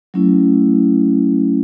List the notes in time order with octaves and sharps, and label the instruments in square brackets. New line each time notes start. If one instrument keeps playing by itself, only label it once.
[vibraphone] F#3 A3 C#4 E4